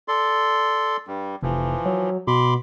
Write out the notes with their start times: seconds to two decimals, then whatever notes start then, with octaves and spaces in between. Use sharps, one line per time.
0.08 A4 D5 C6
1.07 G2 G3
1.43 F1 E3 F3
1.86 F#3
2.27 B2 B5 C6 D6